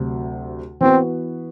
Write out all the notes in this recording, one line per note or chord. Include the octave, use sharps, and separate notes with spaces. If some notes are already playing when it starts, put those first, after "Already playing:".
Already playing: D2 C3 F#3
E3 B3 C4 F#4 B4